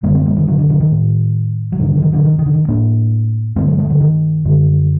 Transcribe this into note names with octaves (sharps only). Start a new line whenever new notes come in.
F#2 D3 G3 A#3
A3 C4
G3 A#3
D#3 G3
D3 F#3
D3
D3 F#3
D#3
A2
F#3
G2 D3 D#3
D3
F#3
D#3
D3 F#3
D#3
D#3
D3
D#3
A2 A#3 D4
G2 D3 A3 C4
F#3 A3
F#3 A3
G3
D3 F#3
D#3
F#2 D3